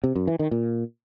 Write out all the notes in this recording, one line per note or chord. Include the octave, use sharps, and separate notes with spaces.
C3
F#2
E3
D#3
A#2